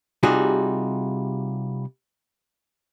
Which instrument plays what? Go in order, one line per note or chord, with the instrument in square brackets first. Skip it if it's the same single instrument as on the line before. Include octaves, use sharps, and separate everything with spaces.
[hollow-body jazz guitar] C3 G3 D#4 F4 F#4 G#4